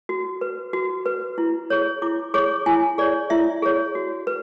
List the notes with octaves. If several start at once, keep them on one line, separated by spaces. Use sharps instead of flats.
F#4
B4
F#4
B4
E4
G#4 C#5
E4 D6
G#4 C#5 D6
E4 G#5
G#4 C#5 D5
E4 E5
G#4 C#5
F#4
B4